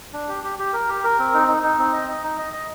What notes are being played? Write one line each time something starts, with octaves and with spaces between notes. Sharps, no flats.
D4
G4
G4
G4
A#4
G4
A#4
C4
D#4
D#4
D#4
C4
D#5
D#5
D#4
D#5
D#5